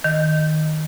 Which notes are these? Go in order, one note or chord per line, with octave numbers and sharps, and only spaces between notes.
D#3